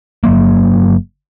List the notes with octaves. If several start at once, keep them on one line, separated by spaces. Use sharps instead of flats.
G1 F#3 A#3